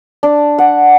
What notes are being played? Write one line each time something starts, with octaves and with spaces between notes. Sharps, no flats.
D4
F#5